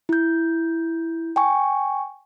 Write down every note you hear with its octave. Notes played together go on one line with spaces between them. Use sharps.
E4 G6
G5 G#5 C#6